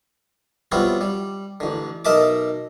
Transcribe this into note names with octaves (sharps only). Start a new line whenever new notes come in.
F#3 G3 B3 C4 E4 F4
G3
A1 D3
B1 A#4 D#5 E5 A5 D6